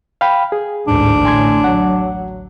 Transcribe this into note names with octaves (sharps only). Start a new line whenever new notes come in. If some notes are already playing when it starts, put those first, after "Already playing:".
F5 G5 B5
G#4
A1 D2 G#2 D4
A2 G#5 C6 G#6
F#3 F#5